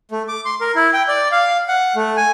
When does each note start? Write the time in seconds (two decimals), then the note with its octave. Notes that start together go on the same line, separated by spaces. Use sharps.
0.11 A3
0.28 D6
0.45 C6
0.61 A#4
0.75 E4
0.93 G5
1.08 D5
1.32 F5
1.68 F#5
1.96 A3
2.17 G#5